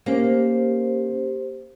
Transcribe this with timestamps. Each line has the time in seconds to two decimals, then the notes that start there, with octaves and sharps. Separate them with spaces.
0.06 A#3 C#4 G4 A#4 C5